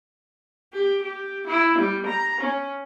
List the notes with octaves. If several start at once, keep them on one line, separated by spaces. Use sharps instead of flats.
G4
G4
E4
G3
A#5
C#4